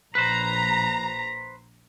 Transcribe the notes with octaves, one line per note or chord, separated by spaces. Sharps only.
A#1 B4 C5 A#5